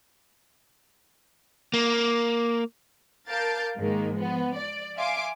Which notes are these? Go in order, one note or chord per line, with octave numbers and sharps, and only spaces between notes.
A#3
A#4 F5 A5 D6 G6 A6
G#2 D#3 G#3 A#3
F3 B3
D5
E5 F5 G#5 C6 D6